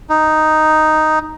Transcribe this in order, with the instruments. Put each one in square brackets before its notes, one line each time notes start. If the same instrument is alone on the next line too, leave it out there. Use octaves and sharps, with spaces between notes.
[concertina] D#4